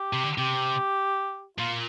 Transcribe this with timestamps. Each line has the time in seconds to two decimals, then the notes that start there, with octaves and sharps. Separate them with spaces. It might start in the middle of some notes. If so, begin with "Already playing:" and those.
Already playing: G4
0.13 C3
0.24 D3
0.38 C3 G4
1.58 A#2 F4